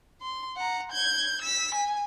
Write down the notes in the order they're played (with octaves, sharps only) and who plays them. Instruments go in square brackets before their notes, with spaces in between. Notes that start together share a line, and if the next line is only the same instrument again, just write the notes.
[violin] C6
F#5 A#5
G6 G#6
E6 B6
G#5